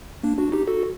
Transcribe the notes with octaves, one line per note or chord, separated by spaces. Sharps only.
A#3 D4
D4 F#4
D#4 G4
F#4 A4